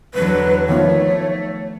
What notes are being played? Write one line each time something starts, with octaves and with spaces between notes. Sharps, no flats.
E2 D3 F#3 B4
D#3 F3 A3 B3 C#5